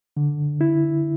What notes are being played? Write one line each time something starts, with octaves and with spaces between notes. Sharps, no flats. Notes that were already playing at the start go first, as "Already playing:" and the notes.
D3
E4